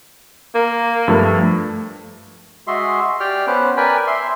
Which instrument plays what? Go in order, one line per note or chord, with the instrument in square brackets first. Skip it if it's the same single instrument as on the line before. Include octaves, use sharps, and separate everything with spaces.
[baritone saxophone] A#3
[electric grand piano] G2 F3 A3
[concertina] G#3 F#4 G#4 E5 C6
G4 D5 G5 F6
B3 C#4 B4 C5
A#4 B4 D5 G5 G#5 B5
E5 C6